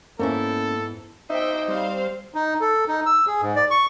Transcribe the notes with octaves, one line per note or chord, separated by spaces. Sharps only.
G#2 A#3 B3 C#4 E4 A4
D#4 C5 E5 G5
G3 C4 C5 F5
D#4
A4
D#4
E6
G#4
G#2
D5
C#6